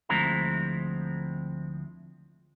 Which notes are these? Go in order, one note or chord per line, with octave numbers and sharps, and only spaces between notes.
D2 F3 G#3 C4 E4 A#5